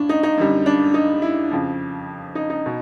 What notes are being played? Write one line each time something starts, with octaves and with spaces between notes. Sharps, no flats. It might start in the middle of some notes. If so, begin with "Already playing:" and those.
Already playing: A2 D4
D#4
D#4
F#2 D3 G3
D4
D#4
E4
F2 C#3 F3
D#4
D#4
B2